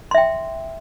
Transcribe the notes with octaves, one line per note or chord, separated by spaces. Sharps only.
E5 G5 C6